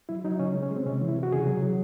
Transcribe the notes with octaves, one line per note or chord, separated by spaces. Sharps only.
F#3 E4
F#3 D#4
C#3 C#4
G#3
C#4
G#3
C4
C3 C#4
E3
E4
C3
F#4
C#3 G#4
F#3
F#3